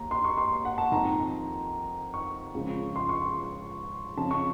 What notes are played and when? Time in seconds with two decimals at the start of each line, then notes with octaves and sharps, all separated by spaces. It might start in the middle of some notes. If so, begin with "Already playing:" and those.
Already playing: D#2 A#5
0.11 C6
0.24 C#6
0.38 C6
0.65 F#5
0.78 A5
0.92 F2 D#3 A#5
2.14 C#6
2.54 C#2 C#3 F3
2.96 C6
3.09 C#6
3.22 C6
4.17 F2 C#3 F3 A5
4.31 C#6